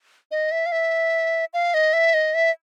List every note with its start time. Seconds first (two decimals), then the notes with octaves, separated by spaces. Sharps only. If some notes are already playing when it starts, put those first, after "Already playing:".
0.31 D#5
0.51 E5
0.66 F5
0.72 E5
1.54 F5
1.74 D#5
1.93 E5
2.14 D#5
2.34 E5